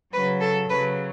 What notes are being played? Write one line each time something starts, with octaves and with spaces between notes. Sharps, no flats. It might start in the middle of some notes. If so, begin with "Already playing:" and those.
C#3 F#3 B4
A4
C#3 F#3 B4